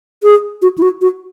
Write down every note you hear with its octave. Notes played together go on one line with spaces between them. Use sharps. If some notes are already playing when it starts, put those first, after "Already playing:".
G#4
F#4
E4
F#4
F#4